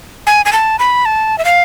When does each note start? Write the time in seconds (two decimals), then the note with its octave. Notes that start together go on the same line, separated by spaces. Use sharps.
0.27 G#5
0.46 G#5
0.53 A5
0.79 B5
1.06 A5
1.38 E5
1.45 F5